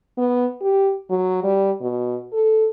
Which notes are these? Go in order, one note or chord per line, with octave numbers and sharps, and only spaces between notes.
B3
G4
F#3
G3
B2
A4